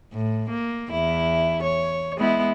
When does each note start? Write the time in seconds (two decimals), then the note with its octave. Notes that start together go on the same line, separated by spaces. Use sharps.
0.13 A2
0.50 A#3
0.90 E2 E4
1.63 C#5
2.17 G#3 B3 E4